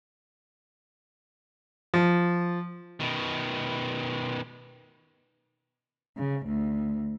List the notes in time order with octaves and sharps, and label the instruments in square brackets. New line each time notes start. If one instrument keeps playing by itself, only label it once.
[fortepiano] F3
[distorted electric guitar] B2 D#3
[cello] C#3
D2